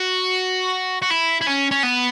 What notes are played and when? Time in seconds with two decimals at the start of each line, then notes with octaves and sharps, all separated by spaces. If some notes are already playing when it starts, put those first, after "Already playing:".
Already playing: F#4
1.02 F#4
1.10 E4
1.41 E4
1.47 C#4
1.71 C#4
1.83 B3